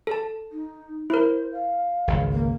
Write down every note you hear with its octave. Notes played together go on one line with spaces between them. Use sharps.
A4 A5
D#4
E4 A#4 C5
F5
G#1 C#2
A#3